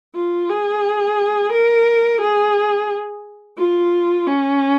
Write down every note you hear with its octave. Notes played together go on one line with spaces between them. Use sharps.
F4
G#4
A#4
G#4
F4
C#4